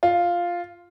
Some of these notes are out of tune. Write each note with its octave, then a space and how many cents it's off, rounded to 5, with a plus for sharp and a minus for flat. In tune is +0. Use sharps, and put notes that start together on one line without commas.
F4 +0